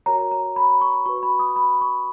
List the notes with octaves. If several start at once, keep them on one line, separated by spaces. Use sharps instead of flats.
F#4 A#4 C#5 A#5
A#5
B5
C#6
F#4 B4 C#6
B5
D#6
B5
C#6